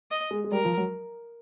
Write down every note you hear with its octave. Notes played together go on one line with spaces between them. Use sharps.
D#5
G#3
G#3
G3 A#4
F3
F#3